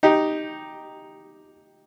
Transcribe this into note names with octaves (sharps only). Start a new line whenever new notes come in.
D#4 G4